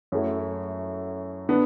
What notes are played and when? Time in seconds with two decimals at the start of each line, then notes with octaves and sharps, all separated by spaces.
0.12 F#2 F#3 A3 E4
1.49 D3 B3 D4